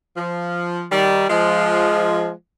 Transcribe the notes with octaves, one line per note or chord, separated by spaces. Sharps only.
F3
D#3 G3
F3 G#3